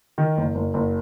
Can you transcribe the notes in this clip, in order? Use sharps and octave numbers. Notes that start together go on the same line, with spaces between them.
D#3
F#1
F#1
F#1